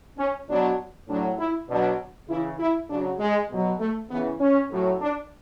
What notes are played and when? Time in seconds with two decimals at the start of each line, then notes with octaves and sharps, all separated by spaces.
0.18 C#4
0.49 B2 F#3 D4
1.08 A2 F#3 D4
1.39 E4
1.69 B2 F#3 D4
2.29 C#3 E3 E4
2.59 E4
2.90 C#3 F#3 D4
3.19 G#3
3.50 B2 F#3
3.79 A3
4.09 C#3 E3 B3
4.40 C#4
4.70 A2 F#3
5.00 D4